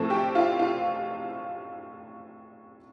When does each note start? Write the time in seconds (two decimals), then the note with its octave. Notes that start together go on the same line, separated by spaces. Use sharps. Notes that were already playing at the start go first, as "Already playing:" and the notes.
Already playing: A2 F3 A3 C4
0.10 G4 G5
0.35 F4 F5
0.59 F4 F5